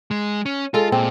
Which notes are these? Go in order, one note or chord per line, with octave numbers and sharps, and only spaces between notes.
G#3
C#4
G#3 F4 A4
A#2 C4